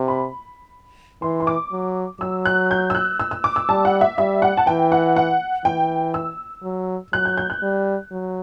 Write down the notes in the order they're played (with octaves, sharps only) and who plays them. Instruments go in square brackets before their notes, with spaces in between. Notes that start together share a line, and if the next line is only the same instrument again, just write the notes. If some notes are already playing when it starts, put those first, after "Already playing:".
Already playing: [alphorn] C3
[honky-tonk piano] B5
[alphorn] E3 [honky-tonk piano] C6
[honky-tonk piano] C6
D6
[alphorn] F#3
[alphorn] F#3 [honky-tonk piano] E6
[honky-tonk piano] F#6
G6
E6
F#6
E6
E6
D6
E6
[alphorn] G3 [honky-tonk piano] A5
[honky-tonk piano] F#5
E5
[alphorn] G3 [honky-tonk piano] E5
[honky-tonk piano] F#5
A5
[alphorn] E3 [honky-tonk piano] G5
[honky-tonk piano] F#5
F#5
[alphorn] E3 [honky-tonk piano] G5
[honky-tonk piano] E6
[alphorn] F#3
[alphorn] F#3 [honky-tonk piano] F#6
[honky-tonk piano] G6
G6
F#6
[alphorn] G3
F#3